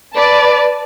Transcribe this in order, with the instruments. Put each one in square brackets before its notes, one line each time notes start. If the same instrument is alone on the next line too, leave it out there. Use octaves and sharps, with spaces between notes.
[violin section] B4 D5 A5